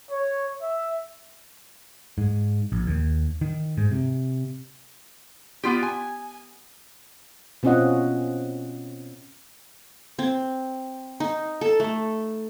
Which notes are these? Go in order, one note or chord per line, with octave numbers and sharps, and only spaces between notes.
C#5
E5
G#2
A#1
D#2
D#3
G#2
C3
B3 F4 G4
G#5
B2 C4 C#4 F4 D#5 F#5
C4
D#4
A4
A3